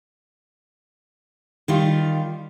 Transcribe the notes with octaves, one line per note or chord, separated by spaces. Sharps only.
D#3 G3 F4